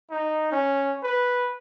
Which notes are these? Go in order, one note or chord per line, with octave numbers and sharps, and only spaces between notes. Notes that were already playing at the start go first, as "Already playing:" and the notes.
D#4
C#4
B4